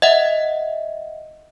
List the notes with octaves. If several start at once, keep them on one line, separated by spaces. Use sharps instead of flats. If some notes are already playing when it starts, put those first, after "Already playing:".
D#5 E5 F#5